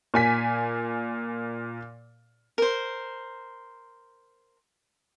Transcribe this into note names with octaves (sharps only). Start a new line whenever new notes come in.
A#2 G#5 B6
A#4 C5